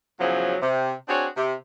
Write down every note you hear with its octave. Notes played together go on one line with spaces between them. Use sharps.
E2 C#3 F3 F#3
C3
C4 D4 F#4 G#4 C#5
C3